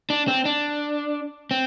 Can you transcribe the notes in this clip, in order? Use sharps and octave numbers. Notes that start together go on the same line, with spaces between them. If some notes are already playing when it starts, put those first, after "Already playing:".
D4
C4
D4
C4